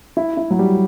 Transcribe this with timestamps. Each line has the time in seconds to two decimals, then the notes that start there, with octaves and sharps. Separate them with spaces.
0.17 E4
0.37 E4
0.51 F#3
0.59 G3